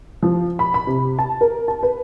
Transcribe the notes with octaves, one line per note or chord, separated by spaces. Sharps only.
F3
B5
B5
C3
A5
A#4
A5
B4